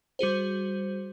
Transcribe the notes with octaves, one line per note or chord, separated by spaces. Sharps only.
G3 F#4 G#4 C5